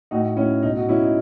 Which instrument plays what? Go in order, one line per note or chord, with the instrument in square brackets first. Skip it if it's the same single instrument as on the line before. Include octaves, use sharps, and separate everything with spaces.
[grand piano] A2 D#4 F#4
A2 C#4 E4
B2 D#4
D#4 F#4
B2 C#4 E4
D#4